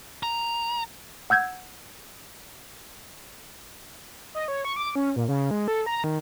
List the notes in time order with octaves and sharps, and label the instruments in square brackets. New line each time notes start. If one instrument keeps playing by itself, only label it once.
[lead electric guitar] A#5
[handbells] F#5 E6 G6 G#6
[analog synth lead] D#5
C#5
C#6
D6
C#4
A#2
C#3
G#3
A4
A#5
D#3